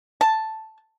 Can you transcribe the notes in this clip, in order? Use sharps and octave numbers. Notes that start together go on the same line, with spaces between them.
A5